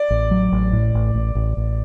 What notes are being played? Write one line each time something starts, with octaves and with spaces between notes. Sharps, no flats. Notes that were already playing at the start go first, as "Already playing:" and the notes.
Already playing: D5
A1
F#3
A1
A2
A1
A1
A1
A1